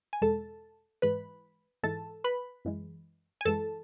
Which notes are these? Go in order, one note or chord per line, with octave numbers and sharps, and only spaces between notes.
G#5
E2 B2 G#3 A4 A5
G#2 E3 G#3 B4 B5
G#2 E3 G#3 A4 A5
B4 B5
F#2 E3 G#3
G#5
F#2 E3 G#3 A4 A5